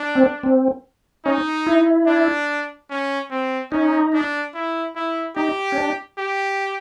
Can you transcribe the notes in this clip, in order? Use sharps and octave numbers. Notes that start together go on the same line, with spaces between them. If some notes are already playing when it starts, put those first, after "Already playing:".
Already playing: D4
C4
C4
C#4 D#4
E4
D4
C#4
C4
C#4 D#4
D4
E4
E4
D#4 G4
C#4
D4
G4